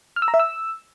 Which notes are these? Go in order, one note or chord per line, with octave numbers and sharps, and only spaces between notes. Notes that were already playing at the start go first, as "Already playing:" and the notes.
F6
E6
A#5
E5
E6